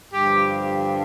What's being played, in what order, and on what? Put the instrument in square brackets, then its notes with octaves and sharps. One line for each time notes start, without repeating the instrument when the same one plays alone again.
[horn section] G2 D3 F3 G4